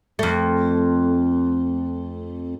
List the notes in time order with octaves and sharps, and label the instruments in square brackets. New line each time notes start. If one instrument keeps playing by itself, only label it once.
[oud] F2 A3